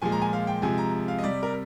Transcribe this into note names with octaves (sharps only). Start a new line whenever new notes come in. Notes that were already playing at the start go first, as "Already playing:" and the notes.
A#2 F3 G#3 G#5
A#5
G#5
F5
G5
C3 F3 G#3 G#5
A#5
F5
D#5
C3 G3 D5
A#4